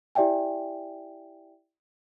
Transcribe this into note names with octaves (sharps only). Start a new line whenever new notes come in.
E4 G4 D5 E5 G5 G#5